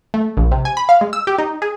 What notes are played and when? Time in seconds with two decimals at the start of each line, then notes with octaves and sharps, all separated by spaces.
0.14 A3
0.37 A#1
0.52 C3
0.65 G#5
0.77 B5
0.89 F5
1.01 G#3
1.13 E6
1.27 G4
1.38 D#4
1.62 G#4